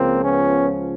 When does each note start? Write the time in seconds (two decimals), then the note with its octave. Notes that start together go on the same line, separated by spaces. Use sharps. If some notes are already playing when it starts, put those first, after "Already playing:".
Already playing: C#2 C#3 F3 A#3 C4
0.23 B3 C#4